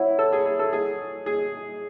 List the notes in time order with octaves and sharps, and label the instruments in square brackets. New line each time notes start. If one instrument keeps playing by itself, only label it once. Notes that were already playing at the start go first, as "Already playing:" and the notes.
Already playing: [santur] F#3 C#4 F#4 [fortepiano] E4
[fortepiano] A4
G#4
G#4
A4
G#4
G#4